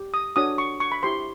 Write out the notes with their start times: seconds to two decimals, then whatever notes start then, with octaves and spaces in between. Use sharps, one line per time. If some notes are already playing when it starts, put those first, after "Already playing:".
Already playing: G4
0.14 D#6
0.36 D4 F#4 A4 C#5 D#6
0.58 C#6
0.80 C#6
0.92 B5
1.03 E4 G4 C5 C6